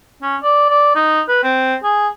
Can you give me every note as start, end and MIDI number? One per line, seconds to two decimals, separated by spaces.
0.22 0.36 61
0.43 0.68 74
0.70 0.92 74
0.95 1.21 63
1.28 1.39 71
1.43 1.75 60
1.83 2.08 68